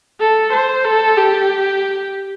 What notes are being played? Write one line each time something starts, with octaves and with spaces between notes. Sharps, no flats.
A4
C5
A4
G4